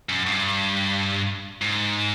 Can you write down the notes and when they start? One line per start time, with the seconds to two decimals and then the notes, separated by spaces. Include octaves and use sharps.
0.09 F#2
0.27 G2
1.62 G#2